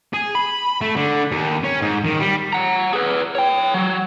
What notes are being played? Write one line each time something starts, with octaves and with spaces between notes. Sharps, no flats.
G#4
B5
A3
D3
D#2
C#4
G#2
D#3
G3
F#5 A#5
G#4 B4
C#5 G5
F#3